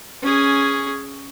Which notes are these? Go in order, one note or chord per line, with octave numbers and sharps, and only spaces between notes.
C#4 G#4